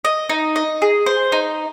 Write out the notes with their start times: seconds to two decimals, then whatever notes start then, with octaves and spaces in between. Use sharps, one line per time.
0.05 D#5
0.30 D#4
0.56 D#5
0.82 G#4
1.06 C5
1.32 D#4